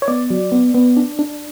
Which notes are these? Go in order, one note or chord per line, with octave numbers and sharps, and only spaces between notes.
C#5
B3 D5
F#3
B3
B3
D4
D4